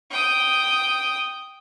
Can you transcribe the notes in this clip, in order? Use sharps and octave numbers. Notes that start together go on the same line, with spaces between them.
G5 D#6